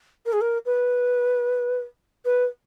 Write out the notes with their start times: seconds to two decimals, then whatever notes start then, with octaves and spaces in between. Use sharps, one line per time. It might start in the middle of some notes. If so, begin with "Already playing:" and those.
0.26 A#4
0.32 G#4
0.41 A#4
0.65 B4
2.25 B4